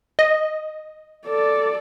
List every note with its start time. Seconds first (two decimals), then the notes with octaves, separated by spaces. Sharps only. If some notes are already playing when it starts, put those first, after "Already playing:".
0.19 D#5
1.27 A4 D5